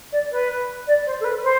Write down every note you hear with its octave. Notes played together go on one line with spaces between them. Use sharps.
D5
B4
D5
C5
A4
B4
C5